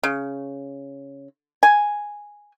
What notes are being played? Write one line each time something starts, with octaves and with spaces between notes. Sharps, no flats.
C#3
G#5